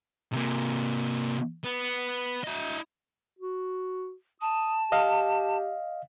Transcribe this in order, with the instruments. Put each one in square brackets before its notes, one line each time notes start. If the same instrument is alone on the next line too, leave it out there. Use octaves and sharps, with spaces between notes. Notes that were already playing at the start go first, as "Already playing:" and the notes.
[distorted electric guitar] C3 A#3
B3
E4 D#5
[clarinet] F#4
[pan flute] A5 [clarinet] D#6
[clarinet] G4 [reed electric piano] D#5 F5